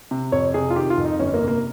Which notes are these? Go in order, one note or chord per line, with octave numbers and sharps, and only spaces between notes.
C3
F2 C#5
C3 G#4
F4
D#3 G4
F4
F2
D#4
G1 C#4
A#3
C3
A#3